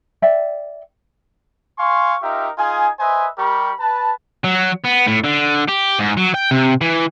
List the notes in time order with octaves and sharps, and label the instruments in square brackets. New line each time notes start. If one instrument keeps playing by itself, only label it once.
[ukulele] D5 E5 G5
[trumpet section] F5 G#5 C6 C#6
D#4 F4 G4 A#4 E5
D#4 F4 G#4 G#5
B4 C5 D#5 E5 G#5
G3 G4 A#4 B5 C#6
B4 A5
[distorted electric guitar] F#3
B3
A2
D3
G4
G#2
F#3
G5
C3
E3